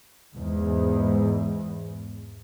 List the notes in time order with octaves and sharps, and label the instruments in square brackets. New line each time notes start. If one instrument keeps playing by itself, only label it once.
[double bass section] E2 G#2